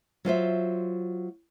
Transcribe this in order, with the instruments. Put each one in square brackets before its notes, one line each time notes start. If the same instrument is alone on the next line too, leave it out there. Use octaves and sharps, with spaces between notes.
[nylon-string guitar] F#3 F4 C5 E5